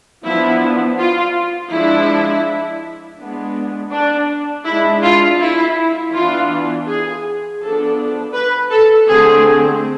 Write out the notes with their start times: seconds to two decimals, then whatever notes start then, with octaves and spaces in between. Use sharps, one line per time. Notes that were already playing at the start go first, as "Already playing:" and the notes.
0.24 F3 B3 D4 E4
0.99 F4
1.71 F3 G#3 D4 E4
3.19 G#3 B3 D4
3.92 D4
4.66 G#3 D4 E4
5.03 F4
5.40 E4
6.13 E3 B3 D4 F4
6.87 G#4
7.61 F3 B3 D4 A4
8.34 B4
8.71 A4
9.08 D3 A3 C4 G#4